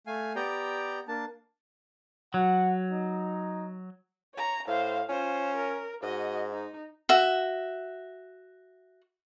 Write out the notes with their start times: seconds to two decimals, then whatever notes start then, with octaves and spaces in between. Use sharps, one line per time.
0.07 A3 F5 G#5
0.36 B3 G4 D5 G5 A#5
1.08 A#3 D4 A5
2.34 F#3 F#5
2.92 D#4
4.35 C#5 A#5
4.67 A2 C5 F5
5.09 C#4 F4 C5
5.56 A#4
6.03 G#2 F#4 D#5
6.52 D#4
7.09 F#4 E5